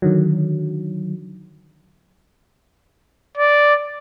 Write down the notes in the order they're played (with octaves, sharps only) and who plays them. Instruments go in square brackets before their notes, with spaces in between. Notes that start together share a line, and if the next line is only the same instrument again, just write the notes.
[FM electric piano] D3 D#3 F#3
[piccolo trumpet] D5